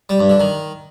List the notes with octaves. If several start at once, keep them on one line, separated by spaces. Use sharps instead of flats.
G3
G2
D3
D#3